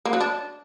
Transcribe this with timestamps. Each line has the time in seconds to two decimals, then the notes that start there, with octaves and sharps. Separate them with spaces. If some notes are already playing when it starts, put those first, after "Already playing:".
0.05 A#3
0.13 F#3
0.20 D4